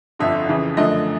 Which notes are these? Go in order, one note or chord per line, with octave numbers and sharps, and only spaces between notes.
G1 F2 D3 E5
F2 C#3 E3
F#2 D3 F3 A3 D#5